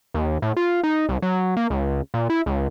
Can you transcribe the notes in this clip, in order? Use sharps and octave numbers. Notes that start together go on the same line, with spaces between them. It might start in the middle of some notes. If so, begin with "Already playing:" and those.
D#2
A2
F4
D#4
C2
F#3
A#3
C#2
A#2
E4
C#2